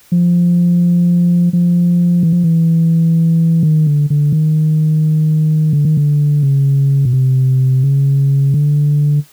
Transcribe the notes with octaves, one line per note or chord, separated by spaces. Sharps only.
F3
F3
E3
F3
E3
D#3
D3
D3
D#3
D3
D#3
D3
C#3
B2
C3
C#3
D3